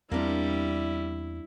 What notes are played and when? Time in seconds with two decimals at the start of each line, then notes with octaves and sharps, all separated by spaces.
0.11 E2 G3 A#3 C4 D4 E4 F4